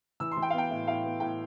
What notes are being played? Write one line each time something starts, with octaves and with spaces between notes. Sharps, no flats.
E3 E6
C6
E3
G5
F5
B3 G5
A2
A2 F5
B3
A2 G5